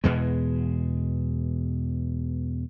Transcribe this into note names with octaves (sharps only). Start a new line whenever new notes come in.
E2 B2 G#3